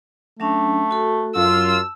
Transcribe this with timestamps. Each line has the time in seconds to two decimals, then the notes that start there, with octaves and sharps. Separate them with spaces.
0.40 F#3 A3 C#4 D4
0.91 F#4 A4
1.35 F#2 F4 A5 E6